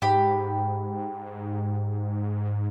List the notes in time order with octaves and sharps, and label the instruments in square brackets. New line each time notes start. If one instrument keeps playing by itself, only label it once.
[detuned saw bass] G#2 [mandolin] G4 B5